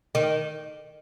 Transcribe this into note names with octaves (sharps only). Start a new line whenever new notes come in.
D#3